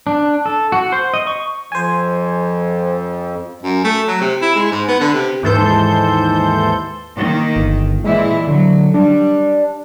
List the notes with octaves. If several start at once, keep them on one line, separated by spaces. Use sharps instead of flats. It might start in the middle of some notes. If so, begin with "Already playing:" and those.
D4
A4
F#4
C5
D#5
C#6
F2 C5 G#5
F#2
A3
F#3
C3
E4
G#3
G#2
B3
D3
C3
D#2 G#2 E3 A4 C5 G6
D#3 A#3
G1
A#2 E3 G#3 E4
D3 F#3
G3 D4